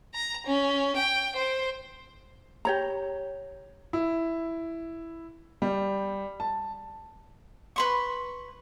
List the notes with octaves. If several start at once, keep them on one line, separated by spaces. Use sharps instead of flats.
A#5
C#4
G5
C5
G4 C#5 A#5
E4
G3
A5
B4 C6 C#6